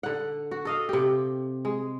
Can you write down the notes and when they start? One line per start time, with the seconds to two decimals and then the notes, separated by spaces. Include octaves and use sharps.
0.03 D3 F#5
0.51 F#4
0.65 A4 D#5 F5
0.89 C3 G4
1.65 G#3